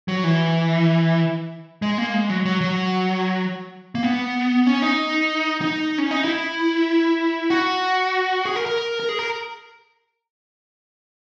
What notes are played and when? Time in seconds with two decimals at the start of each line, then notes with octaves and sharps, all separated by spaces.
0.08 F#3
0.24 E3
1.82 G#3
1.98 A#3
2.14 G#3
2.30 F#3
2.45 F#3
2.61 F#3
3.95 A#3
4.03 B3
4.66 C#4
4.82 D#4
5.61 D#4
5.98 C#4
6.11 D#4
6.24 E4
7.50 F#4
8.45 G#4
8.56 A#4
8.66 A#4
9.00 A#4
9.09 G#4
9.19 A#4